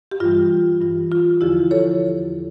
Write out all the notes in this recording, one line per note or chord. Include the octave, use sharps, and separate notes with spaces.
G4
G2 E3 G3 F4
G2 E3 G3 F4
F4
E2 D3 F3 E4 G4
A4 C#5